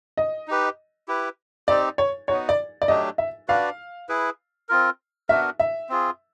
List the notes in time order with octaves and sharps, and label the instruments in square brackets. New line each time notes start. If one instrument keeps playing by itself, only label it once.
[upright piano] D#5
[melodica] D#4 G4 B4
E4 G4 B4
[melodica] C4 D#4 G4 [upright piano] D5
[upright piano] C#5
[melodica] B3 D#4 F#4 [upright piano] C#5
[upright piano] D5
D5
[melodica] F#3 A3 D4 G4 [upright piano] D#5
[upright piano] E5
[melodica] D4 F#4 B4 D5 [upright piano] F5
[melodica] E4 G#4 B4
C4 F4 A#4
[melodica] B3 D4 F#4 A#4 [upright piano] E5
[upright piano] E5
[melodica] C4 F4 G#4